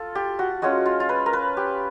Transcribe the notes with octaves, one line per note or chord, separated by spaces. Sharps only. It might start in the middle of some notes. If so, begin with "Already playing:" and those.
Already playing: F4 A4
G4
F#4
G#3 C#4 F4 F#4
F4
F4
B4
A#4
B4
G4